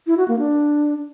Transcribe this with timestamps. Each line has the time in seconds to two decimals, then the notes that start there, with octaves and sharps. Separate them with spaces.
0.07 E4
0.18 F#4
0.28 A#3
0.39 D4